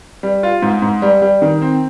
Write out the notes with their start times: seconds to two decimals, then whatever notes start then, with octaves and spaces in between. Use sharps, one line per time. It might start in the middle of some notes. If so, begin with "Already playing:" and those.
0.23 G3
0.43 F4
0.62 G#2
0.82 G#2
1.02 G3
1.22 G3
1.42 D#3
1.62 C4